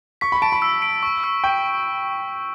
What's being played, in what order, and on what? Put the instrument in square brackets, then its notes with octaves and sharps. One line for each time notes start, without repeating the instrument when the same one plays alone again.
[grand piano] C#6 [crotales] B6
[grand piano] B5
[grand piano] A5 [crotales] D7
[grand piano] B5
[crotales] E6
D7
C#6
E6
[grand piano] G5 [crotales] C#6